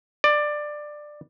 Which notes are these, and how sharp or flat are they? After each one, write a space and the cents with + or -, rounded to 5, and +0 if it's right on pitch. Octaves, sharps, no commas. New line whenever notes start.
D5 +15